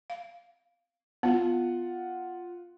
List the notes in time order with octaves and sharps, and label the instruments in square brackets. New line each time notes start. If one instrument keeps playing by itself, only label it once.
[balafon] F5
[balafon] B3 [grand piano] F4 F#5